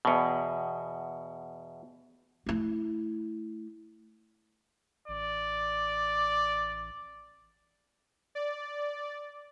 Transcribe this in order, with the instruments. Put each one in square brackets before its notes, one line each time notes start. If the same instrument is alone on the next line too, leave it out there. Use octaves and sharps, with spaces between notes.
[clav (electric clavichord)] E2 B2
[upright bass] A3 E4
[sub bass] A1 [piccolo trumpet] D5
[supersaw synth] D5